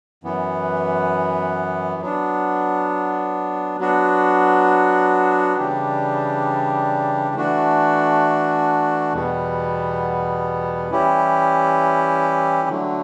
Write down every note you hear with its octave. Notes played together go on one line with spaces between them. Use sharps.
F#2 E3 B3
F#3 B3 D4
F#3 B3 D4 F#4
C#3 E3 G3 D4 G4
E3 A3 D4 F#4
E2 B2 G3 B3
E3 G3 C#4 E4 G4
D3 F#3 A3